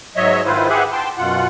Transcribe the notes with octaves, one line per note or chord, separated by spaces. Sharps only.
G#2 F#3 C#5 D#5 E5
G#2 D#3 E4 F4 B4 C5
G4 G#4 B4 E5 F#5
G5 A5 C6
F#2 B2 F4 F#5